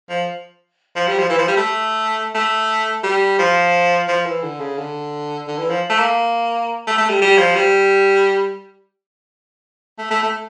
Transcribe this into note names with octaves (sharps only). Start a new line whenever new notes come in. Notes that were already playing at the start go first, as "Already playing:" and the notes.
F3
F3
G3
F3
E3
F3
G3
A3
A3
G3
F3
F3
E3
D3
C#3
D3
D3
E3
F3
A3
A#3
A3
A3
G3
G3
F3
G3
A3
A3
A3